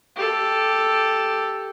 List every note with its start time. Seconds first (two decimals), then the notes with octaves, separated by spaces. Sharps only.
0.16 G4 A4